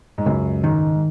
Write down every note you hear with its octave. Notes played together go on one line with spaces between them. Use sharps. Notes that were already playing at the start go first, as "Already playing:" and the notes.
G#2
C#2 F#2
G#2 D#3